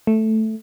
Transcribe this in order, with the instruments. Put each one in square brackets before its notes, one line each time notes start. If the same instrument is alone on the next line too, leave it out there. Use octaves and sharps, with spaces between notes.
[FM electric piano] A3